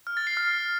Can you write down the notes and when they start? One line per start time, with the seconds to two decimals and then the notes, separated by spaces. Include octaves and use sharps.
0.07 F6
0.17 A6
0.27 C7
0.37 F6